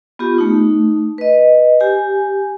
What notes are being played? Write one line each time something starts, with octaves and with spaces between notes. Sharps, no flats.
B3 F4 G4
A3 D#4
B4 D#5
G4 G#5